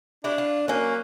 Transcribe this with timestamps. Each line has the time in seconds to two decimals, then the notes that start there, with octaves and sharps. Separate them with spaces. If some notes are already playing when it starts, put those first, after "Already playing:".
0.24 D4 E4 F#4 G4
0.38 F4
0.68 F#3 A#3 C#4